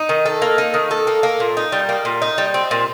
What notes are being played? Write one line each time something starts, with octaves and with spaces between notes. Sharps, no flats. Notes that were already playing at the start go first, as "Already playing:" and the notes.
Already playing: D#4
D#3
A4
A#3
D#4
D#3
A4
A#3
A#3
A#2
D#4
G3
A#3
A#2
D#4
G3
C4
A#2